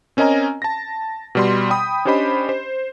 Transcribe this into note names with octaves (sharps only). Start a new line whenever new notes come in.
C4 C#4 A#4 D#5 G#5 A#5
A5 A#6
B2 G3 C6
G5 B5 D#6
C#4 D4 G4 C5 D#5 B5
C5